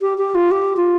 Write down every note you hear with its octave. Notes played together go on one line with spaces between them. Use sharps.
G4
G4
F4
G4
F4